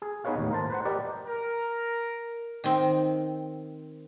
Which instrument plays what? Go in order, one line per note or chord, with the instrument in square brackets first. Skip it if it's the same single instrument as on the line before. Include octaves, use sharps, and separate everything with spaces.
[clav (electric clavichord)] G#4
B3 D#4 G#4 B4 C#5 F5
D#2 A2
A#4 C5 A5
B4 C5 F#5
G4 A#4 B4 D5 D#5
[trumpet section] A#4
[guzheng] D#3 C4